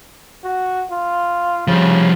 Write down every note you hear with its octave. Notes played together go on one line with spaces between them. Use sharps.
F#4
F4
C#3 F3 G3